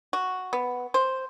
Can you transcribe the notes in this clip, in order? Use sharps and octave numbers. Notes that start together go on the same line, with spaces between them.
F#4
B3
C5